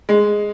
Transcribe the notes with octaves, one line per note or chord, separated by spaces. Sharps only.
G#3